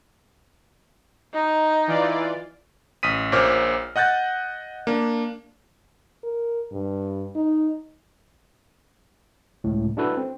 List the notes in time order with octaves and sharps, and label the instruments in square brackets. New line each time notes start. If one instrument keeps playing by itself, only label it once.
[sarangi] D#4
[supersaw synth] E3 F4 D5
[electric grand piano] A1 D#6 B6 D#7
A#1 A#2 C5 C#5 D6 F6
D#5 F#5 F#6 G6 A6
A#3 D4
[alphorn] A#4
G2
D#4
[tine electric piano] C#2 A2
D4 E4 F#4 A4 B4
C4